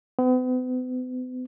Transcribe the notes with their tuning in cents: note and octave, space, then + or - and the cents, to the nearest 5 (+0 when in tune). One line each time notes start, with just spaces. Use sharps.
B3 +45